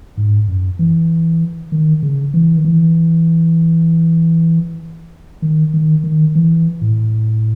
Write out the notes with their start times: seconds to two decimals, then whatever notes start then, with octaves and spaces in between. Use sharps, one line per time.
0.17 G#2
0.48 F#2
0.79 E3
1.72 D#3
2.02 C#3
2.34 E3
2.57 D#3
2.65 E3
5.42 D#3
5.74 D#3
6.04 D#3
6.35 E3
6.82 A2